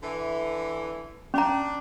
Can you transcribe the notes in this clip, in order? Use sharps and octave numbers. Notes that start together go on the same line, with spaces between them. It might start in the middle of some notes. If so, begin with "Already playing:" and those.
D3 E3
C#4 D4 A#5